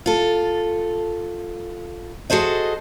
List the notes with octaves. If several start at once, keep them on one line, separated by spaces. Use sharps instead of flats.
F4 A4
F#4 G#4 A4 C5 D#5